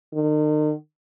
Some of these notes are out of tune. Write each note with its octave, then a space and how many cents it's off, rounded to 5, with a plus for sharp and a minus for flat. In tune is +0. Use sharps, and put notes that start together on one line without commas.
D#3 -40